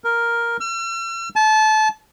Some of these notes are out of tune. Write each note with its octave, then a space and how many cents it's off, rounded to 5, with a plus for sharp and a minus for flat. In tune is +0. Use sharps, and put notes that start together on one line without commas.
A#4 +5
E6 +45
A5 -25